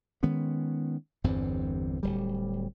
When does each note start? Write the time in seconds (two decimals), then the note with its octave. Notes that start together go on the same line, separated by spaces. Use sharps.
0.23 D#3 G#3 B3 C#4
1.24 G1 E2 G2 C4
2.03 D1 G3